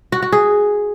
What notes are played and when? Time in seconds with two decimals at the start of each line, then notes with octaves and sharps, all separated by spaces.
0.12 F#4
0.22 F#4
0.32 G#4